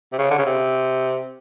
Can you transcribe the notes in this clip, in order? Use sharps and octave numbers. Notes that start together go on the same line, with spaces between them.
C3
C#3
D3
C#3
C3